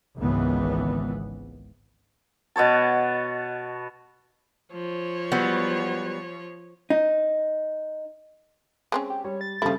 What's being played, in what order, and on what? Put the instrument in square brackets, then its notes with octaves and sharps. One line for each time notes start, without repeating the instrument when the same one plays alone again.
[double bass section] G#1 C#2 E3 B3
[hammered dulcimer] B2 B3 C#5 A5
[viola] F3 C#5
[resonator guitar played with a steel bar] F#3 G3 B3
[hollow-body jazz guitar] D#4
[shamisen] G#3 C4 C#4
[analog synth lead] G4
[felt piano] G3 [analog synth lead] C#5
[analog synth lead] A6
[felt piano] C#3 G3 [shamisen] F3 E4 [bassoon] A3